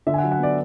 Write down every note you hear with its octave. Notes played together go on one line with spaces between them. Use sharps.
D3 E5
G#5
F#5
F#3
F#5
B3 D5